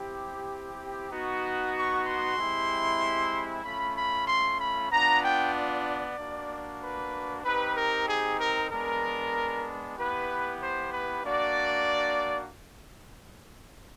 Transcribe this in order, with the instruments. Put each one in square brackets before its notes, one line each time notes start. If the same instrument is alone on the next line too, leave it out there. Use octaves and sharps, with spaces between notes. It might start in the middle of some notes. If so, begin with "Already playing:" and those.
Already playing: [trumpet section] C4 E4 G4
B3 D#4 F#4
C#6
C6
G#3 C4 E4 G4
A3 C#4 F4 B5
B5
C6
B5
B3 D4 F4 A#5
G5
D5
A#3 D4 F#4
B4
C4 D#4 G4 B4
A#4
G#4
A#4
G#3 B3 D4 A#4
B3 E4 G4 B4
C5
B4
A#3 D4 F#4 D5